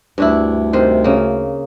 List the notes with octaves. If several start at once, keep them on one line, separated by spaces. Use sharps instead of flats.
D2 G2 D4 E4
C3 D#3 C5
C#3 A#3